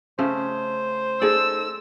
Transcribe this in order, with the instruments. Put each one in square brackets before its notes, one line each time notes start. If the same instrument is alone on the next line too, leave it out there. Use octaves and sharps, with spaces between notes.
[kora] C#3 A3 [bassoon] C5
[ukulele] D#4 G#4 A4 [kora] D5 [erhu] E6